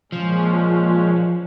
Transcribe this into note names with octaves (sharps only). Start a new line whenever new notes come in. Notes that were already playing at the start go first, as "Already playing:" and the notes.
A#2 F3 G#3 C#4